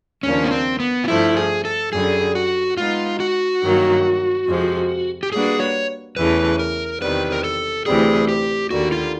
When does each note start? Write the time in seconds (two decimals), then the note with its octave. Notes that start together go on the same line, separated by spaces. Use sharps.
0.23 D#2 C#3 F3 A#3 C#4 D4
0.44 B3
0.51 C4
0.80 B3
1.04 F4
1.08 G2 D3 F3 A3 E4
1.36 G#4
1.65 A4
1.93 F#2 D3 G3 G#4
2.35 F#4
2.77 G#3 B3 D#4 F4
3.20 F#4
3.62 G2 D#3 F#3 A#3
4.47 F2 C3 F3 G#3
5.23 G4
5.32 G3 A#3 D4 F#4 G#4 B4
5.60 C#5
6.17 E2 C#3 E3 A3 B4
6.59 A#4
7.01 E2 C3 D#3 G3 B4
7.32 A#4
7.44 A4
7.86 D2 C3 E3 G3 G#4
8.28 G4
8.71 D#2 D3 G3 A#3 F#4
8.92 F4